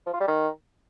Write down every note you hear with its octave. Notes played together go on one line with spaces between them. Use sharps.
F3
F4
G3
D#3